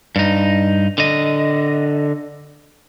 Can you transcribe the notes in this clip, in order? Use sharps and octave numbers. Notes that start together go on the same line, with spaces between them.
G2 D#4
D3 D#5